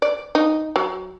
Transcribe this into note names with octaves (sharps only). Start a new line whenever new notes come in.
D5
D#4
F#3